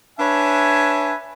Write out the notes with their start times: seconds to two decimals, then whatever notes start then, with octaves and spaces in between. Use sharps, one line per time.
0.19 D4 B4 C#5 E5 G#5